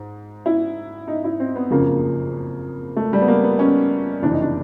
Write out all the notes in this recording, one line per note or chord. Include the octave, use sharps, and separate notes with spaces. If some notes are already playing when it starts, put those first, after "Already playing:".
Already playing: G#2
E4
D#4
E4
C4
B3
F#1 F2 C#3 F3 A#3
A3
G3
B3
A#3
B3
C#4
F#1 F2 C3 E3 D4
D#4
D4